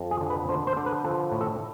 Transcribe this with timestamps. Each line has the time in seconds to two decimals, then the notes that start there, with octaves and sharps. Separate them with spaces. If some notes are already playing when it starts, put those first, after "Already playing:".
Already playing: F2
0.11 G#4
0.21 D3
0.30 B4
0.49 D3 C5
0.67 C5
0.77 D3
0.86 B4
1.04 F3 A4
1.32 A2
1.41 A4